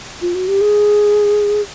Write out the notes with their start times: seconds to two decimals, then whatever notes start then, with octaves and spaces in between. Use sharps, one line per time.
0.22 F4
0.35 F#4
0.48 G4
0.61 G#4